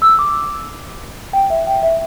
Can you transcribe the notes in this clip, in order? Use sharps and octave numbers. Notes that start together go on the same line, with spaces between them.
E6
D6
G5
E5
G5
E5